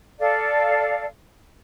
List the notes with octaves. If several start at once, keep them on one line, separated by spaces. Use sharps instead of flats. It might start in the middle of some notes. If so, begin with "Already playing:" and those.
A4 D5 F5